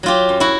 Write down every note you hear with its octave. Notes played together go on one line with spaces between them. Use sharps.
F#3 F4 G4
F#2
E4 F#4